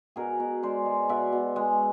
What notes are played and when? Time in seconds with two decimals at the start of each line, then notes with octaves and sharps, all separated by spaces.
0.16 B2 G#4 A#4
0.40 B2
0.63 G#3 C5 D5
0.85 G#3
1.09 B2 D5 E5
1.33 B2
1.56 G#3